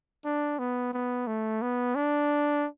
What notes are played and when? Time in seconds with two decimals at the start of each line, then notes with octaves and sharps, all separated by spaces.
0.25 D4
0.59 B3
0.93 B3
1.27 A3
1.62 B3
1.95 D4